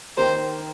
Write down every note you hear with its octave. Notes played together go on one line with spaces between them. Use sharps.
D#3 A#3 G4 A#4 C5